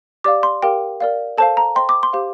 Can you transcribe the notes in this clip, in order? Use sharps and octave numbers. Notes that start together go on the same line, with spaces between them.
G4 D5 F5 D6
C6
G4 A#4 F5 G5
A#4 D5 F5
A4 C5 F5 A5
A#5
C5 D#5 G5 C6
D6
C6
G4 C5 F5